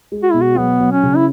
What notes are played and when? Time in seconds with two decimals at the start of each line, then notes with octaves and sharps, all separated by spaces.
0.12 G#3
0.23 F#4
0.31 B2 E4
0.41 F#4
0.57 F#3 B3
0.80 F#3
0.92 C#4
1.03 C#3
1.16 E4